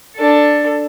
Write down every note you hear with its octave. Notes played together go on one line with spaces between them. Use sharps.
D4 A4